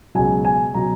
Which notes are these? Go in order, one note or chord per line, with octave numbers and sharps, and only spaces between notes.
C#2 B2 F#3 G#5
G#5
B2 F#3 A#5